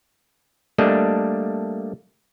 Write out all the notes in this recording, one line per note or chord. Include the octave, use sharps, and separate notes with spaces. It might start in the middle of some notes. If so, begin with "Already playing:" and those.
G3 A3 A#3 D4 D#5